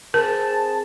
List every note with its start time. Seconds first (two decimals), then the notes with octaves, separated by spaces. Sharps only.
0.14 C4 G#4 A#4 A5